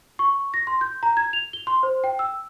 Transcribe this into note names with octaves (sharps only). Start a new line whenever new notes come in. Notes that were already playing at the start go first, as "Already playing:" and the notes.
C#6
A#6
C6
G6
A#5
G#6
F7
G7
C6
C5
G5
E6